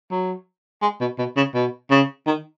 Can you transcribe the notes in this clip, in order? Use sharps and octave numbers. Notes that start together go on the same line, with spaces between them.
F#3
G#3
B2
B2
C#3
B2
C#3
D#3